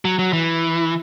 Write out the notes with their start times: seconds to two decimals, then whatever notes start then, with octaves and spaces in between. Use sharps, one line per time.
0.05 F#3
0.19 F#3
0.33 E3